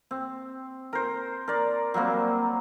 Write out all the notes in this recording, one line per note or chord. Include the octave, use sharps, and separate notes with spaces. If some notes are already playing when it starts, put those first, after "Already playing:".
C4
A#4 C5
A#4 D5
F#3 G3 A#3 C4